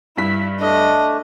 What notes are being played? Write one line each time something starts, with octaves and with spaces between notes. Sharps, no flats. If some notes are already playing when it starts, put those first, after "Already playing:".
G2 E4 B6
A3 D4 D#5